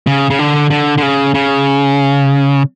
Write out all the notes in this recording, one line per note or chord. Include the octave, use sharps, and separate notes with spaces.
C#3
C#3
D3
D3
D3
C#3
C#3